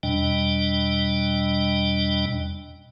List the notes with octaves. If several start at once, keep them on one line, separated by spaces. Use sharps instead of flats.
E2 B2 G3 D4 D#5 G5